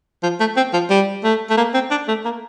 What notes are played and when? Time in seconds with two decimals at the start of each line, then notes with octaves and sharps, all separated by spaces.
0.23 F3
0.40 A3
0.56 C4
0.73 F3
0.90 G3
1.24 A3
1.50 A3
1.57 A#3
1.74 C4
1.91 D4
2.08 A3
2.25 A#3